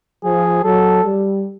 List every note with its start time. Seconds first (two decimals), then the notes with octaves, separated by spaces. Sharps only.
0.24 F3 G#4
0.64 F#3 A4
1.04 G3